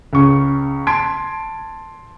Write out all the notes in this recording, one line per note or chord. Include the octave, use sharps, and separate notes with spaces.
C#2 C#3 C#6
A5 C6 G#6 D7